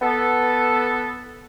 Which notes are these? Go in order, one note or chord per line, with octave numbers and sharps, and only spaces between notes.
B3 A4